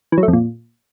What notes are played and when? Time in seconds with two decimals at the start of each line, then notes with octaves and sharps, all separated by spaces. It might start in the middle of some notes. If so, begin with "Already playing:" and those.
0.12 E3
0.18 F#3
0.23 A3
0.28 F2
0.33 A#2